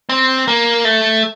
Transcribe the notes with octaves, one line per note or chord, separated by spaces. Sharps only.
C4
A#3
A3